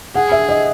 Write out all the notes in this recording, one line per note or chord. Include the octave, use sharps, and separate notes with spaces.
G#4 F#5
E5
D#5